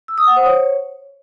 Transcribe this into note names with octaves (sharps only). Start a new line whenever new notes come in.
E6
D#6
F#5
C5
C#5